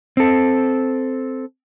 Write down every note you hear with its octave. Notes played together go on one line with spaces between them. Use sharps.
C4 A4